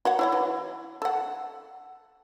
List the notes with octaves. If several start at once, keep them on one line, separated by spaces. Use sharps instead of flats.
F#4 C#5 F#5
E4 C#5 F#5
E3
A4 F#5